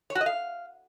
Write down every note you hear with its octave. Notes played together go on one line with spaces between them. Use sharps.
C#5
F#4
D#5
F5